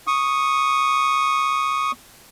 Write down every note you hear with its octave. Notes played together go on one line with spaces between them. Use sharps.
C#6 D#6